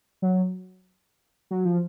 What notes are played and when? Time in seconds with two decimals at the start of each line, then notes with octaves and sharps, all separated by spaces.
0.22 F#3
1.51 F#3
1.65 F3